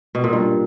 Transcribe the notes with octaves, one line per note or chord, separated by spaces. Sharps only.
B2
A#2
G2